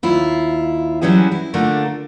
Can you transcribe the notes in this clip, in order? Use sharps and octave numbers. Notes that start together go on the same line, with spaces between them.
D#2 E4 F4
E3 F#3 G3 C#4 F#4 G#4
E4
D3 A3 A#3 D4 F4 A#4